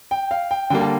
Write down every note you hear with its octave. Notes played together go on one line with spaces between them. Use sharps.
G5
F5
G5
D3 G3 A#3 G5
A5